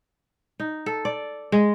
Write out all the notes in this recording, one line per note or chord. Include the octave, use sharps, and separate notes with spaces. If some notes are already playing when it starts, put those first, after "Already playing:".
D#4
A4
D5
G#3